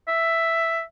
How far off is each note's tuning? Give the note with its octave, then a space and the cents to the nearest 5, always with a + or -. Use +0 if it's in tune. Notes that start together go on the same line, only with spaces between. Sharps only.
E5 +5